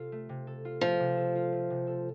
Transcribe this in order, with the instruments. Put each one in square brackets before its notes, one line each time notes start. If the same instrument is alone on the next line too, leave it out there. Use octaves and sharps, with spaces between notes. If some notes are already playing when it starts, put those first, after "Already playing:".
Already playing: [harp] C3 F4 A4
A3
C3
A4
F4
[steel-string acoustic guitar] F3 [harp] A3
[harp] C3
A4
F4
A3
C3
A4